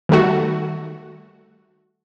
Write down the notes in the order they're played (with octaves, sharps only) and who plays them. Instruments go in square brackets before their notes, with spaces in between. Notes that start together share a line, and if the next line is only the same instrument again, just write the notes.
[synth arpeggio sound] D#3 G3 A3 F#4